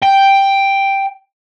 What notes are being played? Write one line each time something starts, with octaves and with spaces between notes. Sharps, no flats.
G5